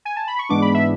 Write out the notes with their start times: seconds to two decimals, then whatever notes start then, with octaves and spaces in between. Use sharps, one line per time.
0.05 G#5
0.16 A5
0.27 B5
0.39 C#6
0.49 G#2 E3 G#3 B3 D4 D6
0.62 B5
0.74 E5